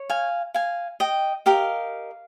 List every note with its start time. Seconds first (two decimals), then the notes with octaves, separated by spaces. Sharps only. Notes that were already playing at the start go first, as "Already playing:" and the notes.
Already playing: C#5
0.09 F5 G#5
0.54 F5 G#5
1.00 D#5 G5
1.46 G4 A#4 D#5 F5